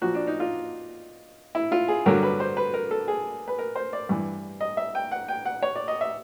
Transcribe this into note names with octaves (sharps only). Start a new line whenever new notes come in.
A#2 F3 F#4
D4
D#4
F4
E4
F4
G#4
G2 D3 F#3 A#4
B4
C5
B4
A#4
A4
G#4
B4
A#4
C5
D5
G2 E3
D#5
E5
G5
F#5
G5
F#5
C#5
D5
D#5
E5